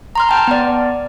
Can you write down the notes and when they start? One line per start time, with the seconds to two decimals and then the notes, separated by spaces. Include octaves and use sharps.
0.15 A#5 C6 F6
0.29 G5 A5
0.48 B3 D5